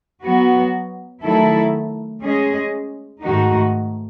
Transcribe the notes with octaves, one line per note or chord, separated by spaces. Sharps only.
F#3 B3 F#4
D#3 F#3 A3 E4 A4
G#3 C#4 G#4 D#5
G#2 D#3 A3 D#4 F#4